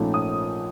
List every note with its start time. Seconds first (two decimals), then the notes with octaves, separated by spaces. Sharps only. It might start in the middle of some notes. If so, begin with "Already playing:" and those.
Already playing: A#1 G#2 F3 A3 C#4
0.14 D#6